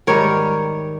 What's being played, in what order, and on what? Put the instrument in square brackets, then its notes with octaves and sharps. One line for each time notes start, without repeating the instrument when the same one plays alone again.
[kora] G#2 D#3 G3 A#4 C#5